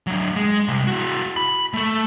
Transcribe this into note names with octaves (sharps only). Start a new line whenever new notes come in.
F#3 D4
G#3
C3 G3
E4 F#4
B5
A3 A4